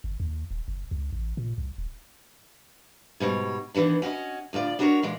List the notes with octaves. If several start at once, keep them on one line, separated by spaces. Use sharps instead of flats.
G1
D#2
D#1
F#1
C#2
A1
A#2
C2
D#1
G#2 B2 G3 C#5
D#3 E3 G3 B3 D4
C#4 F#4 C5 D#5
D2 A2 F4 D5
D4 E4 F#4 A4 A#4 C#5
A#2 E3 G#3